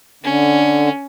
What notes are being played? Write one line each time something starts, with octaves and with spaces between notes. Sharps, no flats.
D3 C#4